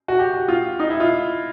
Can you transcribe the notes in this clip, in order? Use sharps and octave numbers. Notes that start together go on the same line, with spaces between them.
F#4
G4
F#4
F4
D#4
E4
F4